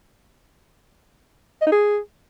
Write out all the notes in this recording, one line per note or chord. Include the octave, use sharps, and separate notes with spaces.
D#5
D#4
G#4